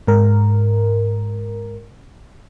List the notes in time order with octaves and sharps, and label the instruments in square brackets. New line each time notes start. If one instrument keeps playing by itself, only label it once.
[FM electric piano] G#2 A#4